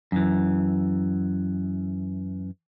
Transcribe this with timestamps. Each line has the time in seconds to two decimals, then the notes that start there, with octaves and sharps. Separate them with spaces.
0.12 F#2 E3